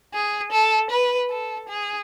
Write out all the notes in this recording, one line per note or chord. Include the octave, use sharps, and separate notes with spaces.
G#4
A4
B4
A4
G#4